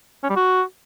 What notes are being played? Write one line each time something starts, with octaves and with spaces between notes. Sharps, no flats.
C#4
G3
F#4